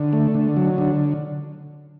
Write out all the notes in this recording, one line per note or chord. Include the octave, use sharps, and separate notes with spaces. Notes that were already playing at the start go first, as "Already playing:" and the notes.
Already playing: D3
A3
D3
F#3
D3